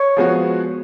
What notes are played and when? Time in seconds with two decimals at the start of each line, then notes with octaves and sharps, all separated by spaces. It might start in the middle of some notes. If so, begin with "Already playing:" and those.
Already playing: C#5
0.17 F3 G#3 B3 F#4